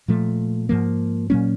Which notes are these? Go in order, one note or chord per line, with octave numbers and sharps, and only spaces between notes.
A#2 F3 A3
G#2 F3 A#3
A#2 F#3 A#3 C#4